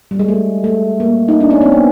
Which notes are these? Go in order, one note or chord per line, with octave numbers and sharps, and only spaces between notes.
G3
G#3
A3
A3
A#3
D#4
D4
C#4
C4
B3